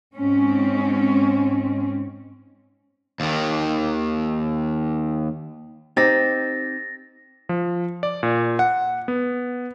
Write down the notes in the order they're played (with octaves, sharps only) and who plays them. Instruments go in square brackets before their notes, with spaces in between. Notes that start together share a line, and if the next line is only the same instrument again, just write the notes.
[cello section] G#2 C4 C#4
[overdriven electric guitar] D#2 D#3
[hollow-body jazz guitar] C4 D#4 G4 [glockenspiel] A6 A#6
[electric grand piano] F3
D5
A#2
F#5
B3